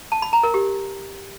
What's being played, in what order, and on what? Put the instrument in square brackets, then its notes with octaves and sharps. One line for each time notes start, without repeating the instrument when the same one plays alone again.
[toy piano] A5
B5
A#5
A#4
G4